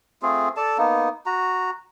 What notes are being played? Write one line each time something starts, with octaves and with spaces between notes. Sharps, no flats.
A3 C4 F4 G#4
A4 D5 A5
A#3 B3 D#4
F#4 A#5